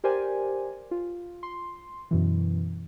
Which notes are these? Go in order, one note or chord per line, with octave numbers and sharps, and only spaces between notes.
G4 A#4 C5 D5 G#5
F4
C6
F#2 B2 E3